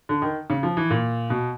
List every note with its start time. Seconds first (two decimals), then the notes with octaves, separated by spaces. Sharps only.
0.09 D3
0.22 D#3
0.50 C#3
0.63 F3
0.77 E3
0.90 A#2
1.30 B2